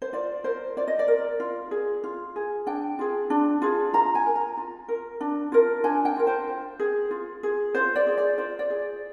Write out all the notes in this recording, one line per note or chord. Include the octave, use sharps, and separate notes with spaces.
C5
F4 D5
A#4 C5
F4 D5
D#5
D5
A#4
F4
G#4
F4
G#4
D4 G5
F4 G#4
D4
F4 G#4
F4 A#5
G#5
A#4
A#5
F4
A#4
D4
F4 A#4
D4 G#5
G5
F4 A#4
C5
F4
G#4
F4
G#4
F4 C5
D5
G#4
D5
F4 C5
D5
G#4